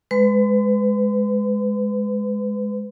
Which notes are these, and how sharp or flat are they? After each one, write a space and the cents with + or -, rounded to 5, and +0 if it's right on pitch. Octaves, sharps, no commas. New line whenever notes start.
G#3 +0 B4 +25 C6 -45